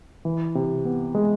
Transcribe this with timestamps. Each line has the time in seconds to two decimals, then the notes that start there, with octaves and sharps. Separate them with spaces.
0.25 E3
0.55 C3
0.85 B3
1.15 G#3